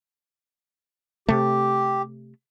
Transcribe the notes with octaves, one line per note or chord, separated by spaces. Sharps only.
C3 A3 G4